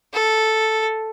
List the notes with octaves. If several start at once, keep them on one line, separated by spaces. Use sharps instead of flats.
A4